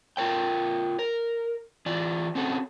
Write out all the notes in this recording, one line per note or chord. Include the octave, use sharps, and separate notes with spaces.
F4 A#4 C#5 G5
A#4
E3 F4 D5
C4 C#4 F#4 A4